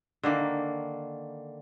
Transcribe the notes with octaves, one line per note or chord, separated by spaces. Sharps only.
D3 D#3 A#3